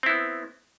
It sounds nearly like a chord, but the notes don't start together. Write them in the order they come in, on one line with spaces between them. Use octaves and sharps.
C4 E4 B3